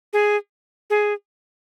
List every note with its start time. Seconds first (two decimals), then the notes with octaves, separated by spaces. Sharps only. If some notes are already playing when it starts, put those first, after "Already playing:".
0.13 G#4
0.90 G#4